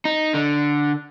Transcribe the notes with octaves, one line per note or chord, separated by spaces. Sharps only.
D#4
D3